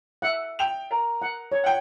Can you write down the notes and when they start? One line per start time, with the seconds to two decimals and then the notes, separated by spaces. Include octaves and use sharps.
0.22 E5 F#5
0.59 G5 F7
0.91 A#4
1.22 F#5
1.52 C#5
1.64 F#5 G5